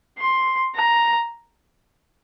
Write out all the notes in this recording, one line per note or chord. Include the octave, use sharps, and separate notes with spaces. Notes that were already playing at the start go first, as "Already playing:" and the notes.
C6
A#5